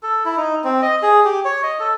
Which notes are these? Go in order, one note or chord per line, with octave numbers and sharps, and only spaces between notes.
A4
E4
D#4
C4
D#5
G#4
G4
C#5
D#5
A4